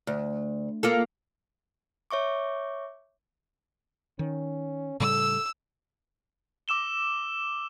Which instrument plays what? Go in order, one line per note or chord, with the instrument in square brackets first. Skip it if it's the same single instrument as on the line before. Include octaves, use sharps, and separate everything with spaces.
[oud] D2
A#3 F4 A4
[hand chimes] C#5 E5 C#6 D6
[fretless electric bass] D#3 [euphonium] C#4
[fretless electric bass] A2 C#3 G3 [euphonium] A4 [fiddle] E6
[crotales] D6 E6 E7 G7